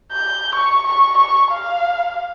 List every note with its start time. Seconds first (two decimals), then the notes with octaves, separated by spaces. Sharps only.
0.12 G6
0.55 C#6
0.86 C#6
1.17 C#6
1.51 F5